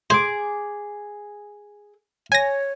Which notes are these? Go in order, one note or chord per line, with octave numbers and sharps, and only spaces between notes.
G#4 C5 D6
C#5 G#5 A#6